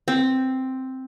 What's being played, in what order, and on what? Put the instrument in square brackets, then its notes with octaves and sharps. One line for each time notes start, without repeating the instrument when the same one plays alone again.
[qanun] C4